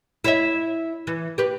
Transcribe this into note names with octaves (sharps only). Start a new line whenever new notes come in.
E4 C#5 E5
E3
G4 B4